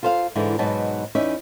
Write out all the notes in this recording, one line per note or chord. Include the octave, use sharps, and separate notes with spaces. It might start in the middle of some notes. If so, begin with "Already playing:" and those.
F4 A4 C5 D5 F5
G#2 D3 E3 D4 E4
G#2 B2 F#3 B3 D#4 A5
E2 C#4 D#4 D5 E5